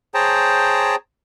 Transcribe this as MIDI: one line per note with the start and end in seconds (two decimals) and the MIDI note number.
0.14 0.95 68
0.14 0.95 72
0.14 0.95 73
0.14 0.95 79
0.14 0.95 81
0.14 0.95 82